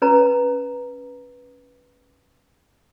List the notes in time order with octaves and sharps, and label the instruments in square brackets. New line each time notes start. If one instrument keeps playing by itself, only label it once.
[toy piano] C#4 B4 A#5